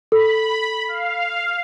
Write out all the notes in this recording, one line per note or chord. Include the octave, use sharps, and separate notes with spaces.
A4 B5
F5